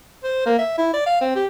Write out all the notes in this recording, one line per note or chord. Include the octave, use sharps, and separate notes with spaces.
C5
A#3
E5
E4
D5
F5
C4
G4